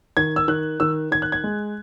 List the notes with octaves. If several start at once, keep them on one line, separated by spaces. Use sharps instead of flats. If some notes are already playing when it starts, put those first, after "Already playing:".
D#3 G#6
E6
D#3 F#6
D#3 E6
D#3 G#6
F#6
G#6
G#3